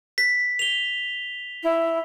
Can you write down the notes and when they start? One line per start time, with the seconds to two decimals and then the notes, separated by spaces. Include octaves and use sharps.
0.18 B6
0.59 F7 G7
1.63 E4